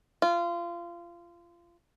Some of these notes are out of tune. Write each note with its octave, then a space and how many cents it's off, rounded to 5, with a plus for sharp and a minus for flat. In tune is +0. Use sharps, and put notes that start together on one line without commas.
F4 -25